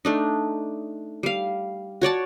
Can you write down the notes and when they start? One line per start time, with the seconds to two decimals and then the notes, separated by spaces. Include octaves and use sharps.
0.05 A3 D4 D#4
1.23 G3 F5
2.01 F#4 C#5 D5 A5